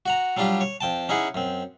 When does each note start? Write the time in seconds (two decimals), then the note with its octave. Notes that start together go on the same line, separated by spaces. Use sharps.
0.06 F#4 F#5 A#5
0.37 F#3 G3 D4 F4 G4
0.61 C#5
0.81 F2 G5 A5
1.09 C#4 D#4 E4 G#4 F#5
1.35 F#2 C4